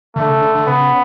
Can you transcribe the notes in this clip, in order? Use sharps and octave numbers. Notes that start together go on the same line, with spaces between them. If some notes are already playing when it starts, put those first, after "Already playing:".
D3 A3
C#3
D3
D3
C#3 B3